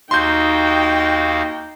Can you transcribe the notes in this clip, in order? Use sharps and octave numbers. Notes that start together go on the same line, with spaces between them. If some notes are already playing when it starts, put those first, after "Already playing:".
D#2 D#4 F#4 F5 G5 C6 G6